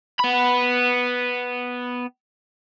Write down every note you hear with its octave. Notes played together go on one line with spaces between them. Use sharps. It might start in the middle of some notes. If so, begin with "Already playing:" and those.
B3 B5